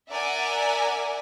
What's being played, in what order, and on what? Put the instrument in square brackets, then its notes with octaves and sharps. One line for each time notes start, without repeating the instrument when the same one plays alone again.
[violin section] A#4 D5 E5 F#5 G#5